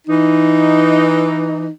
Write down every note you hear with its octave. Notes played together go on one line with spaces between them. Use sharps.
E3 D#4